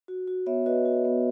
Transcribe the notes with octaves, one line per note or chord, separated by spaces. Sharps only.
F#4
F#4
B3 C#5 E5
F#4 B4 D#5
F#4
B3